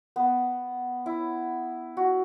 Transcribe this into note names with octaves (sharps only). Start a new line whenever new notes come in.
B3
E4
F#4